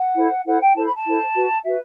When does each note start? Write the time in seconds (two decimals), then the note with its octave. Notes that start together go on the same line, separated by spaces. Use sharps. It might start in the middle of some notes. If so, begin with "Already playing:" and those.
Already playing: F#5
0.15 E4 A4 C5
0.46 E4 A4 C5 F#5
0.61 G5
0.75 E4 A4 C5 A5
0.84 B5
0.95 A5
1.05 E4 A4 C5
1.34 F#4 B4
1.64 F#4 B4 E5